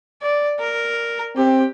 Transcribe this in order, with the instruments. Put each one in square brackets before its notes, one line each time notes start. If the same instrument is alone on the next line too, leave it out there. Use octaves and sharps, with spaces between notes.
[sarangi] D5
A#4
[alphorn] C4 [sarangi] G4